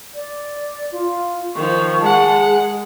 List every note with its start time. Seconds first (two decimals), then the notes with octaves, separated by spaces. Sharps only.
0.14 D5
0.92 F4
1.55 D#3 F3 C#6
2.01 G#3 F#5 A5
2.40 G#4